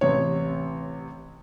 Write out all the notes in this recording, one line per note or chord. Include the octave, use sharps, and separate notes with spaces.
A1 C3 C#5